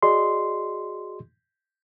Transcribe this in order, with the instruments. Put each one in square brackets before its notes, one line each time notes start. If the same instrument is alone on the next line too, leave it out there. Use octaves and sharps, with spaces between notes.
[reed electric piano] F#4 G#4 D5 D#5 C6